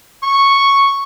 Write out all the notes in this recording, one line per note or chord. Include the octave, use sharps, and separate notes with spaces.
C#6